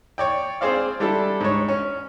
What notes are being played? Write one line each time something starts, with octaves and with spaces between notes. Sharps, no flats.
C#5 D5 G5
C4 G#4 C5 D5 F5
G3 D4 E4 A4
G#2 C#5
C#4